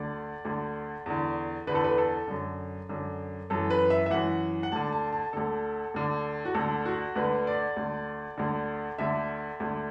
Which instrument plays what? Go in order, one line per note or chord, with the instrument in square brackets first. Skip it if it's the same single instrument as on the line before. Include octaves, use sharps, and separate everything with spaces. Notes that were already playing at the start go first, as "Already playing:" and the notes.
Already playing: [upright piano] D2 D3 D5
D2 D3
E2 D3
E2 D3 B4
A4
B4
A4
F#2 D3
F#2 D3
F#2 E3 A4
B4
E5
E5
F#2 E3 F#5
F#5
D2 D3 A5
A5
A5
D2 D3 A4
D2 D3
F#4
D2 D3 A4
F#4
D2 D3 B4
D5
D2 D3
D2 D3
D2 D3 E5
D2 D3